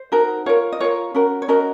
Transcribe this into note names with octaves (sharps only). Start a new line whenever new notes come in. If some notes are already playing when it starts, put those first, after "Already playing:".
Already playing: C5
D#4 F#4 A#4
F4 A#4 C#5
D#5
F4 A#4 C#5
C#4 F#4 A#4
C#5
C#4 F#4 A#4 D#5